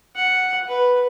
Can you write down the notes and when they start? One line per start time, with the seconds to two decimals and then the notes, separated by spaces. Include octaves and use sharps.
0.16 F#5
0.68 B4